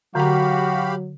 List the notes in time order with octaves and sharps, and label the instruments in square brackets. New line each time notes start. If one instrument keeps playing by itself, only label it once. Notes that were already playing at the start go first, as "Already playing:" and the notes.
[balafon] D3 A#5 [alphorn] F#3 [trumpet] F#4 [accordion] G4 F5 B5